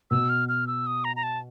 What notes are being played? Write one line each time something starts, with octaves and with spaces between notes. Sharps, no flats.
B2 E6
F6
F6
E6
D#6
A#5
A#5
A5